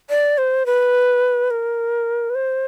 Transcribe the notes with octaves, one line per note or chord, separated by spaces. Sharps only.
D5
C5
B4
A#4
B4
C5